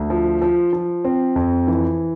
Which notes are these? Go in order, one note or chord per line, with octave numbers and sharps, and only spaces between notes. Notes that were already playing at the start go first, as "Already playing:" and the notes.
Already playing: D2
F3
F3
F3
C4
F2
E3